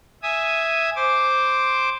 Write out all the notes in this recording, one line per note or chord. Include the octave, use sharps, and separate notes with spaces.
E5 G#5 D#6
C5 D6